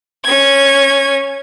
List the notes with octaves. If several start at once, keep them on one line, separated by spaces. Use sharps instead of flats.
C#4 G#6